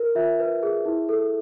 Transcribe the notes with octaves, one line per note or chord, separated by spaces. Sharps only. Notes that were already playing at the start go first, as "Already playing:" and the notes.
Already playing: A#4
F4 E5
B4
G#4
E4
A4